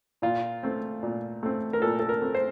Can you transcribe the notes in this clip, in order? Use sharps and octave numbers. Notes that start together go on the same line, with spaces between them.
A#2 F4
A3 C4
A#2
A3 C4
A#4
A#2 A4
A4
A#4
A3 C4
C5